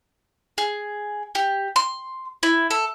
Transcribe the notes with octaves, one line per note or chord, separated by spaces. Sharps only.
G#4
G4
C6
E4
A4